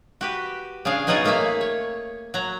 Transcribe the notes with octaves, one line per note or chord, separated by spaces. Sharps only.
F#4 G4 B4
C#3 D4 G#4 F5
B2 F#3 D#4 F4 F#4 G#4
A3 A#3 G#4 E5 F5
C#5
F#3 A#5